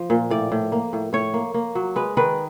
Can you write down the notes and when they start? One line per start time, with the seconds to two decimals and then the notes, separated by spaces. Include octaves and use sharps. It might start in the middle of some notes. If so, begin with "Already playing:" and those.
Already playing: F3
0.10 A#2
0.30 A2 D5
0.52 A2
0.72 A#3
0.93 A2
1.13 A2 C#5
1.34 A#3
1.54 A#3
1.75 F#3
1.96 G#3 B4
2.17 D#3 B4